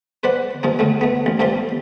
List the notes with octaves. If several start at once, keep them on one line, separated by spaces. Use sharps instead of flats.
B4 C5 D5 F#5
G2 F3 A#3
A2 D3 A3
A3 B3
A1
G2 F3 G3 A3 G4 C6